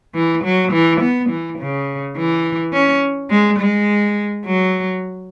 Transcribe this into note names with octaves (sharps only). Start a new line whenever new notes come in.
E3
F#3
E3
B3
E3
C#3
E3
C#4
G#3
G#3
F#3